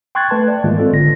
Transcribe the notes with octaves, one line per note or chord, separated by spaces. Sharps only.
G5 C6 C#6 F#6 G#6 A6
A3 B4 A5
D5
G#2 D#3 E3 G#3 A#3 F4
C4 F4 A4
G1 D3 A#6